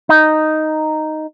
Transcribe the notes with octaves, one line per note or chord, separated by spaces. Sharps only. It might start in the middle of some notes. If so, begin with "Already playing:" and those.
D#4